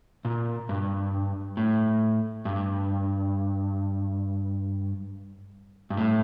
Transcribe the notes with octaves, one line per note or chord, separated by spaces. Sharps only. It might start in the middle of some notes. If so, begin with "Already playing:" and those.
A#2
G2
A2
G2
G2
A2